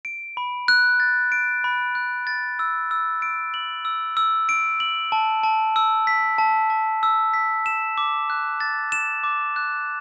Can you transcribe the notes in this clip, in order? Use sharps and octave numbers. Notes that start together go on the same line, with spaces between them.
D7
B5
F#6
A6
D7
B5
F#6
A6
E6
E6
D7
F#7
E6
E6
D7
F#7
A5
A5
E6
B6
A5
A5
E6
B6
E7
D6
F#6
A6
E7
D6
F#6